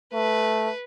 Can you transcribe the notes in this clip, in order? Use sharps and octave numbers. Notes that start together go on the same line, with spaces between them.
A3 B4